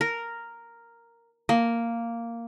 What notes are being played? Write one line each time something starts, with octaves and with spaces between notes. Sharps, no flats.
A#4
A#3